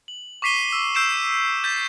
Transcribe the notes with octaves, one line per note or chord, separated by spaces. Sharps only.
F#7
C#6 D6 B6 C7 D#7 G7
E6
E6 G6 C7 D7 E7
D#7
E6 G6 A6 B6 E7